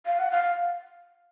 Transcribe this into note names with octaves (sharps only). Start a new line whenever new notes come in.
F5
F#5
F5